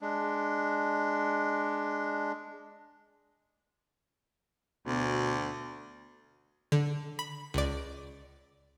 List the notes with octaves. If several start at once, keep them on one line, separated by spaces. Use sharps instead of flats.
G#3 D4
D2 B2
D3
B5
C#2 D5